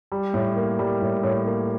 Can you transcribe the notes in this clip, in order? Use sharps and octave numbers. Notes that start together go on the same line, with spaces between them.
G3
A2
A#3
G3
A2
A2
A#3